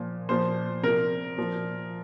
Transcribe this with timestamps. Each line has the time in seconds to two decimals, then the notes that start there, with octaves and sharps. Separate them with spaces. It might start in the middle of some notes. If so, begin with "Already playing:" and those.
Already playing: A#2 F3
0.29 A#2 F3 C5
0.83 C3 F3 A#4
1.37 A#2 F3